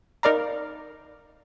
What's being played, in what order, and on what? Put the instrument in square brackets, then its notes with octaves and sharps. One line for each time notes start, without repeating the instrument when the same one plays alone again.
[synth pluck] D#4 A#4 D5 F5 A#5